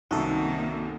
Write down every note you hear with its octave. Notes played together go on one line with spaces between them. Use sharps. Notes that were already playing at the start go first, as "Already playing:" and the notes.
C2 F#2 C3 D#3 A#3 D#4 F#4 A4